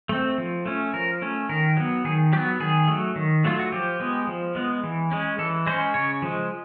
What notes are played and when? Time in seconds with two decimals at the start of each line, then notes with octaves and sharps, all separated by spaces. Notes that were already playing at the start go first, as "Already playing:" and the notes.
0.09 A3 C4
0.38 F3
0.66 A3 C#4
0.94 F3 A#4
1.22 A3 C#4
1.49 D#3 A#4
1.77 F#3 B3
2.04 D#3 G#4
2.33 F#3 G4
2.37 B3
2.60 D#3 G#4
2.88 F#3 A3
3.16 D#3
3.44 F#3 A3 F4
3.59 F#4
3.72 F3 G4
4.00 G#3 B3
4.27 F3
4.55 G#3 B3
4.83 E3
5.11 G#3 C#4
5.39 E3 A4
5.66 G#3 C#4 C5
5.94 C#3 C#5
6.22 F3 G#3